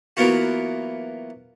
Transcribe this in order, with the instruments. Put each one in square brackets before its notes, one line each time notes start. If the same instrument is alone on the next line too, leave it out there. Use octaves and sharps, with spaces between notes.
[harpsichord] E3 F#3 A#3 B3 F4 F#4